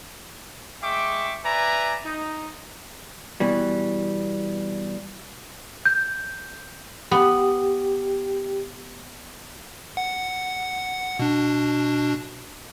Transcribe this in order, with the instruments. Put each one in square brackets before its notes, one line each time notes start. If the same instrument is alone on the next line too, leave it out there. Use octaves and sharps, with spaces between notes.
[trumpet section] G#3 E5 G5 C#6 D6
B4 D5 E5 G#5 A#5
D#4
[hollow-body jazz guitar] B2 E3 G3
[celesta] G6
[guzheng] B3 [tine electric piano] G4
[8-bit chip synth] F#5
B2 D4